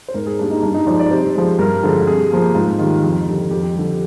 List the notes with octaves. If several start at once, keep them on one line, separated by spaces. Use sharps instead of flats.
C5
G#2 A#4
G#4
G3 A#3 D4
D#4
G2 D4
D#4
F3 G#3 D5
D5
C3 C5
F3 G#3
G2 A#4
D3 F3 G#3
C3 G#4
F3 A#3
G#2 F4
D#3 G3 F4
F2
D3 G3
F2 G4
D3 G3